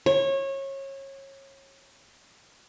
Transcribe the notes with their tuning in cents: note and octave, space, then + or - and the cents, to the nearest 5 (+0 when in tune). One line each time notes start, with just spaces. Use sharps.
C#5 -25